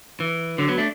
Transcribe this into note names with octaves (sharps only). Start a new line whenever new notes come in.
E3
D3 F#3
F#3 B3
A3 D4